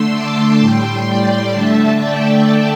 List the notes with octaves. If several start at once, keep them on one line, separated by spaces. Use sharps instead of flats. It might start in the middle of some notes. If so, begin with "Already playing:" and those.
Already playing: D3 A3 C6 E6
A5 D6
A2 G3 G5 C6
D5 G5
D3 A3 E5 A5
D5 G5